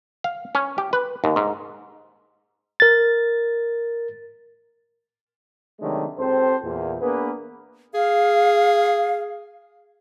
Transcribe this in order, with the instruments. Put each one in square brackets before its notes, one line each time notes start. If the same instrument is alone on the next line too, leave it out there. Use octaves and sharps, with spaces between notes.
[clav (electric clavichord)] F5
C#4
G4
B4
D#2
G#2
[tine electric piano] A#4 A6
[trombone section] C3 D#3 F#3 G#3 A3 D4
C#2 C4 G4 A4 C5
E2 A#2
A#3 B3 D4 G#4 B4
[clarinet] G#4 [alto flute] F5